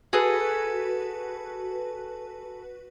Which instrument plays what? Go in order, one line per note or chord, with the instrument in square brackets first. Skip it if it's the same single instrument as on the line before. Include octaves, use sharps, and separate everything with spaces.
[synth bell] F#4 B4 [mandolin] G#4 A4